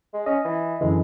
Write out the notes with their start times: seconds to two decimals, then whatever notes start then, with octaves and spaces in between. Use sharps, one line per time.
0.14 G#3
0.26 C#4 D#5
0.45 E3
0.81 F#2 D3 E3 G#3